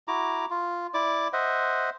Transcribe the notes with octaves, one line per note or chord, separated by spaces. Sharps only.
E4 F#4 A#5 D6
F4
E4 D5 D6
C5 D#5 E5 F#5